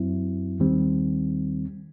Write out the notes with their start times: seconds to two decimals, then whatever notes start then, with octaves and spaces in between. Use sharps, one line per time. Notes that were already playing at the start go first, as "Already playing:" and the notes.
Already playing: F#2 F#3 C4 E4
0.60 D#2 D#3 G3 C4